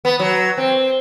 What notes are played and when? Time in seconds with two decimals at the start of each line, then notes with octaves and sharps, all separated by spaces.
0.05 B3
0.19 F#3
0.57 C4